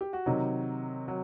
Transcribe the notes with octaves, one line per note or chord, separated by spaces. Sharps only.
G4
F#4
C3 D#3 F#3 D#4
F#3